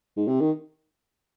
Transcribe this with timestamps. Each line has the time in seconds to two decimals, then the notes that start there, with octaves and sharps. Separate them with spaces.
0.17 G#2
0.28 C3
0.40 D#3